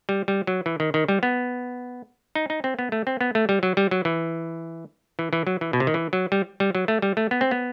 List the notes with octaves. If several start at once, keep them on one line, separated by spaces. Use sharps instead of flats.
G3
G3
F#3
E3
D#3
D#3
G3
B3
D#4
D#4
C4
B3
A3
C4
B3
A3
G3
F#3
G3
F#3
E3
E3
E3
F#3
E3
B2
C3
D#3
E3
F#3
G3
G3
F#3
A3
G3
A3
B3
C4
B3